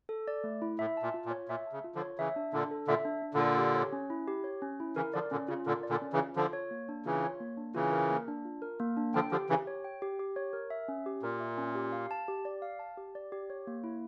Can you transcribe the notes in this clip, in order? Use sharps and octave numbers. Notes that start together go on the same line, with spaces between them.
A4
D5
A3
E4
A2 E5
A5
A#2
F4
A#2
C#5
A#2 E5
A5
C#3
F4
D3 F3
C#5
C#3 E3 E5
D4
A#2 D3 D4
A4
A#2 D3 E5
D4
D4
A#2 D3
A4
G4
C#5
C#4
E4
G4
C#5
C#4
E4
C#3 E3 A#4
D3 F3 D5
A#2 D3 C#4
C#3 F4
A#2 D3 A#4
D5
A#2 D3
C#4
C#3 E3
F4
D3 F3 F4
C#5
A#3
D4
C#3 E3 F4
C#5
A#3
D4
C#3 E3 F4
A#4
A#3
D4
F4
A#4
A#3
D4
D3 F3 G5
D3 F3 G4
C#3 E3 G4
C#5
G5
G4
G4
C#5
A#4
E5
C#4
G4
A#2 A#4
E5
C#4
G4
F5
A5
G4
D5
F5
A5
G4
D5
G4
C#5
A#3
E4